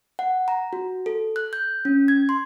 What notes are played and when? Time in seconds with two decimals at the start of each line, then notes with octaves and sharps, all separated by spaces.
0.19 F#5
0.48 A#5
0.73 F#4
1.06 A4
1.36 F#6
1.53 G6
1.85 C#4
2.08 G#6
2.29 C6